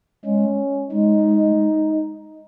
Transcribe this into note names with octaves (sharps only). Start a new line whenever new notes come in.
G#3 C#4
G#3 D#4